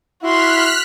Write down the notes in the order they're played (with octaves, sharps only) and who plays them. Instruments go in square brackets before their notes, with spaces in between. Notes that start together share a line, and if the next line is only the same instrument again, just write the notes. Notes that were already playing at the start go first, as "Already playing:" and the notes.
[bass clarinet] E4 [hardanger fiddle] F#4 C6 [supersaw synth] F6 F#6 B6